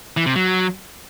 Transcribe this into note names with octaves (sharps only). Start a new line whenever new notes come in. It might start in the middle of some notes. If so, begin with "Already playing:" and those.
E3
C3
F#3